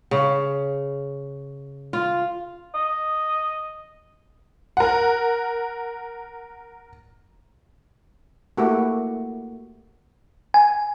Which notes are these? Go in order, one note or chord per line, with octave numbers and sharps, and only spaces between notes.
C#3
F4
D#5
A#4 F#5
A3 A#3 E4 F#4 G4
G#5